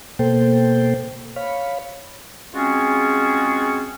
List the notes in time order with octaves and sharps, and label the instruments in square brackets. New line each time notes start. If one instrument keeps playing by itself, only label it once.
[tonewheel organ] B2 A#3 A4 C5 G5
C#5 F5 B5
[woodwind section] G#3 C4 C#4 F4 F#4 G#4